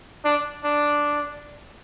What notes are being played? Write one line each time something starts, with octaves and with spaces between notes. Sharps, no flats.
D4
D4